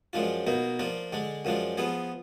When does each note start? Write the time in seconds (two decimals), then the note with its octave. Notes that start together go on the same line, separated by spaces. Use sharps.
0.13 F#2 F3 G#3 D4 F4
0.47 B2 A#3 D#4
0.79 F3 A#3 D4 F4
1.13 D3 G#3 D4
1.45 F#2 F3 G#3 D4 F4
1.77 F3 B3 F4 G#4